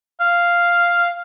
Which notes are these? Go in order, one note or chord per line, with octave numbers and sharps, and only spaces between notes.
F5